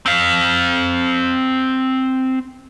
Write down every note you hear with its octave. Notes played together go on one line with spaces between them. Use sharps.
C4 F5